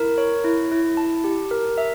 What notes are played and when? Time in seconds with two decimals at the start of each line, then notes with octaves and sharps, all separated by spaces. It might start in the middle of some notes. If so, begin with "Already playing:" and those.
Already playing: E4 A#4
0.18 C#5
0.44 E4
0.71 E4
0.97 A5
1.24 G4
1.51 A#4
1.78 E5